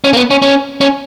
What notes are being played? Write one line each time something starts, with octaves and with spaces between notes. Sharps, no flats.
C#4
A#3
B3
C#4
C#4
C#4